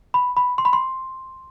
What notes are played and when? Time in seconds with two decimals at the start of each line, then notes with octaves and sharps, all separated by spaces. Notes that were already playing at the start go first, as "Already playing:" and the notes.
0.14 B5
0.37 B5
0.58 C6
0.65 B5
0.73 C6